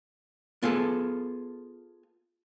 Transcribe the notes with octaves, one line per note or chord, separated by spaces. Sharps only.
B3 F4 G#4 A4